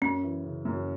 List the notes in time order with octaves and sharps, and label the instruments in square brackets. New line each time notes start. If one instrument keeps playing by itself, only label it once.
[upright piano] F#2 [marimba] C#4
[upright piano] E3
C#3
F#2